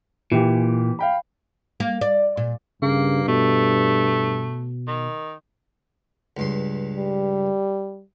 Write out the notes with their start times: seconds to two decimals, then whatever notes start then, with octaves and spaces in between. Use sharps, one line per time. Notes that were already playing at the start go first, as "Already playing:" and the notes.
0.32 A#2 E3 G4
0.99 F5 G5 B5
1.80 A#3
2.01 D5
2.37 A#2
2.82 G2 C#3 A#3
3.28 B2 A3
4.87 D#3
6.37 C#2 G2 C6
6.98 G3